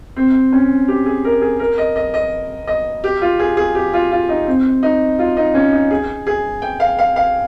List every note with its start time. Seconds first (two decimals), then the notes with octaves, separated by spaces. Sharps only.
0.16 C4
0.53 C#4
0.88 G4
1.06 G#4
1.25 A#4
1.42 G#4
1.59 A#4
1.78 D#5
1.96 D#5
2.14 D#5
2.67 D#5
3.04 G4
3.21 F4
3.39 G#4
3.57 G#4
3.75 G4
3.93 F4
4.12 F4
4.29 D#4
4.47 C4
4.83 D#4
5.19 F4
5.37 D#4
5.54 C#4
5.73 D#4
5.91 G#4
6.27 G#4
6.62 G5
6.80 F5
6.99 F5
7.16 F5